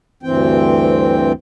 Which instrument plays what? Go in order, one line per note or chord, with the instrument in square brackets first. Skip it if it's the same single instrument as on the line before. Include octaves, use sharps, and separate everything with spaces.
[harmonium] D2 G2 E3 C4 G5